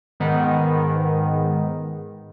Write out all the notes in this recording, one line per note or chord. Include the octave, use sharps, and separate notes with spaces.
G#2 D#3 B3